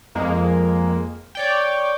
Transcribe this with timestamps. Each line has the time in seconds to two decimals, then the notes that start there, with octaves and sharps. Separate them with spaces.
0.15 F2 G#3 A#3
1.35 C#5 D5 G5